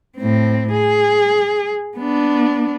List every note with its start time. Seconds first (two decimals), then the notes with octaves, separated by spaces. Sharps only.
0.18 A2 C4
0.72 G#4
1.98 B3 D4